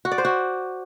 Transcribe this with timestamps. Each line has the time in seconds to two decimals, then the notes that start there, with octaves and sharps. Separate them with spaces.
0.05 F#4
0.12 D5
0.18 C5
0.25 F#4